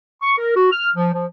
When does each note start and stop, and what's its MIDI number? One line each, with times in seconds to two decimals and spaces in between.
0.22 0.34 85
0.38 0.56 70
0.56 0.70 66
0.71 0.89 89
0.95 1.13 53
1.13 1.26 53